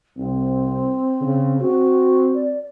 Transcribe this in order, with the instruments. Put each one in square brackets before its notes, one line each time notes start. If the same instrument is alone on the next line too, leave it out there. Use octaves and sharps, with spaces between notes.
[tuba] C2 [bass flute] C4
[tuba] C#3
[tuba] C4 [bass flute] F#4
[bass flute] D5